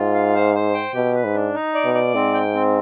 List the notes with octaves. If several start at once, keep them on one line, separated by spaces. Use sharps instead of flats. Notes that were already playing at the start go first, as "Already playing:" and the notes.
Already playing: G#2 F4
F5
C5
C5
G5
B2 G4
B4
G#2
D4
D#4
D5
B2
D5
G#2 C4
G5
C4